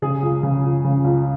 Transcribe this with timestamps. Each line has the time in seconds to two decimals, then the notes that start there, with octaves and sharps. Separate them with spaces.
0.02 C#3 G#4
0.23 C#2
0.43 C#3
0.64 C#2
0.84 C#3
1.04 C#2